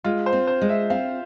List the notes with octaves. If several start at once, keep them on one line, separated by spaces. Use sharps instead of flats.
G#3 F4
C5
C4
C5
G#3
E5
C4 F5